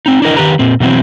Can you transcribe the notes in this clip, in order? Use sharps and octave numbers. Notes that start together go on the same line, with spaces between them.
C4 D#4
D4 E4 A#4 D#5
D#3 G4 B4 A#5
A#2 C4
B2 E3 F#3 C4